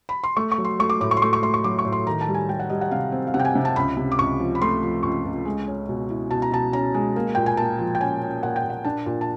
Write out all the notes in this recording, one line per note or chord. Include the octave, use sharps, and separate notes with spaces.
B5
C6
A3 C#6
C#6
F#3
C6
A3 C#6
D6
A2 D6
C#6
C6
A3 C#6
C#6
A3 C6
C#6
F#3 D6
C#6
A2
C6
D#3 A#5
A5
G3
G#5
G3 G5
F#5
G3 D#5
F#5
C3 F5
C4
F5
C3 F#5
G5
G#5
C3
A5
C#2 B5
C3
D6
C#2 C#6
F3
B5
A3 C6
F3
C#2 C#6
C#2
G#3
C#4
B2
E4
B2 A5
A#5
B2 A5
C#4 A#5
G#3
A#3
A#2 G5
G#5
A#3 A5
F3
G5
C#4 G#5
C#4
A#2 F#5
G5
A#2
F#5
D4 A5
A#2
A5